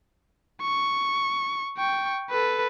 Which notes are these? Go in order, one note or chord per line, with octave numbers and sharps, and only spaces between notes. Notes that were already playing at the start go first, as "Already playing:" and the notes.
C#6
G5 C#6
A4 B4